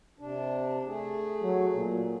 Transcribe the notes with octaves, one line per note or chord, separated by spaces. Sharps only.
C3 D4
A3 G#4
F#3
A#2